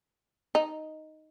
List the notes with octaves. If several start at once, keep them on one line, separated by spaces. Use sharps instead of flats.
D#4